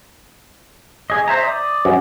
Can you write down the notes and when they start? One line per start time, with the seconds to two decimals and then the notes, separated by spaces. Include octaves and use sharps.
1.10 G#4 D#5
1.28 C5 E5 A#5
1.43 D5 D#6
1.85 F#2